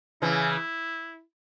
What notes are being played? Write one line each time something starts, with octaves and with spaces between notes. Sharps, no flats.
C#3 E3 E4